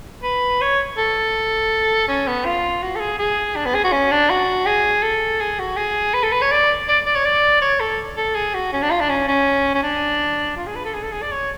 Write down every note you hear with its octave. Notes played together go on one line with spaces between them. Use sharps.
B4
C#5
A4
C#4
B3
F4
F#4
A4
G#4
G#4
D4
B3
G#4
F#4
C#4
D4
F#4
G#4
A4
G#4
F#4
G#4
B4
A4
B4
C#5
D5
D5
D5
C#5
D5
C#5
A4
A4
G#4
F#4
C#4
D4
F4
D4
C#4
C#4
C#4
D4
F4
G#4
B4
A4
G#4
A4
G#4
D5
C#5